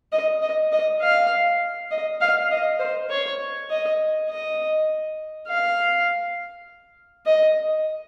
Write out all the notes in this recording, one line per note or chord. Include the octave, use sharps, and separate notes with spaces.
D#5
D#5
D#5
F5
D#5
F5
D#5
C5
C#5
D#5
D#5
F5
D#5